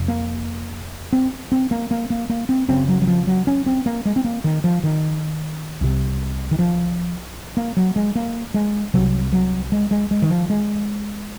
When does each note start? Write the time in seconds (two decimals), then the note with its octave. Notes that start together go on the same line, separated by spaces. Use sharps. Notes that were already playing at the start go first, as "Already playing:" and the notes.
Already playing: F1 F2 C3
0.08 A#3
1.13 C4
1.52 C4
1.71 A#3
1.91 A#3
2.10 A#3
2.30 A#3
2.49 C4
2.68 F#1 F#2 C#3 C4
2.88 F#3
3.02 F#3
3.08 F3
3.27 F#3
3.47 C#4
3.66 C4
3.86 A#3
4.06 G#3
4.16 C4
4.24 A#3
4.44 D#3
4.64 F3
4.84 D#3
5.81 C2 C3
6.51 D#3
6.59 F3
7.57 A#3
7.77 F#3
7.96 G#3
8.16 A#3
8.54 G#3
8.94 C2 C3 F#3
9.33 F#3
9.72 G#3
9.91 G#3
10.11 G#3
10.22 D#3
10.30 F3
10.50 G#3